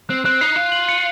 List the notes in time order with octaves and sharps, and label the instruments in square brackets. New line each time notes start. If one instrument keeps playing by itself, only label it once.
[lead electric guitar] C4 [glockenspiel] F#6
[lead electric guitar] C4 [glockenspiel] F#6
[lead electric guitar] D#4 [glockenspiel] C7
[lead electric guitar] F4 [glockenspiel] F#6
[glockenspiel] F#7
C#7